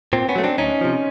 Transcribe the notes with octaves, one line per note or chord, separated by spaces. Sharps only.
A#2 C4
B3 C#4
F#3 A3
C4 D4
D2 C#4 D#4
C3 F3